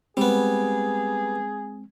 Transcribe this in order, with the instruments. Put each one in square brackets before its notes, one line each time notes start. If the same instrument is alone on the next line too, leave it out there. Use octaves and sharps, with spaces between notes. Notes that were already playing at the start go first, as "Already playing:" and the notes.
[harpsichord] G3 B3 [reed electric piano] G#3 C4 [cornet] G#4